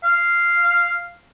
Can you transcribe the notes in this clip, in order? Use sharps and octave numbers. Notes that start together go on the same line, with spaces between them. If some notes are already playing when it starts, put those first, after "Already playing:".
F5